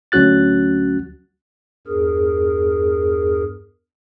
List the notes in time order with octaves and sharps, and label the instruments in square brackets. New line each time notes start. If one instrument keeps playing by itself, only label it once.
[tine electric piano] D2 F#3 C#4 F#4 F#6 A6
[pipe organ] E2 G2 G#4 A#4